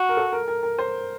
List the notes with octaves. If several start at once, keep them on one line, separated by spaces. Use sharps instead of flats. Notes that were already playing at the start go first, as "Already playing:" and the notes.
Already playing: F#4
A#4
A4
A#4
A#4
A#4
C5